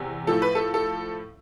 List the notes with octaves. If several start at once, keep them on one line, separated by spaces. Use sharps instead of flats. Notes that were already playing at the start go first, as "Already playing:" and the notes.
Already playing: E2 C3
A2 F3 A4
B4
A4
A4